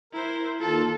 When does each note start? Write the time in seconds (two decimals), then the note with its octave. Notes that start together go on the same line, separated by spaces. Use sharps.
0.13 E4 A#4 C5
0.61 D#2 F4 A4 A5